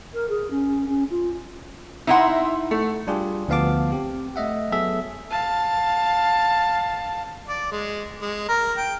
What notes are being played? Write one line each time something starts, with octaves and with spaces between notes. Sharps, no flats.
A#4
G#4
C#4
C#4
F4
D#4 E4 E5 F#5 A#5 C6
A3
G3 D4 F4 G4 G#4
D2 F3 B3 F5 A5 D6
C4 G4
A3 D#5 E5 F#5
F#3 B3 G#4 A4 E5
F5 A5
D5
G#3
G#3
A#4
G5